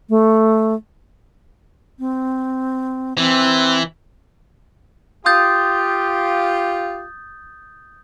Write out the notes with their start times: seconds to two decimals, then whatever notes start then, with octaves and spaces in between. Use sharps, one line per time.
0.09 A3
1.99 C4
3.18 E3 C4
5.26 F4 G4 D#6 G6 A6